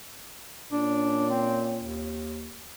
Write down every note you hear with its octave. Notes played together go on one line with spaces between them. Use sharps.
A#2 C#4 D4
C4
D#2